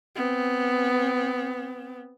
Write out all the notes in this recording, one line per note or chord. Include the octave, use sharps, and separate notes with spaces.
B3 C4